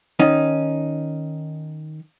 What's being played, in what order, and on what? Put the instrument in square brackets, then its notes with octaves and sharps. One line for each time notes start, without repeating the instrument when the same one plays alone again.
[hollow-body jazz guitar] D#3 C#4 D#4